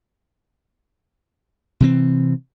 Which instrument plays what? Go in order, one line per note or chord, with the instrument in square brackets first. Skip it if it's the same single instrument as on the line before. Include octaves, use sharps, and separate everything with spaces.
[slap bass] C3 E3 C4